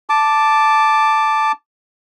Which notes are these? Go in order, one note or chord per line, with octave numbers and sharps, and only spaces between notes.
A5 D6